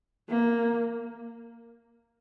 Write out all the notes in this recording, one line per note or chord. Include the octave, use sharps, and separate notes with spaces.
A#3